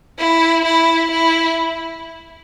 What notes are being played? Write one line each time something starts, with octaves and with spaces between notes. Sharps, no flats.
E4
E4
E4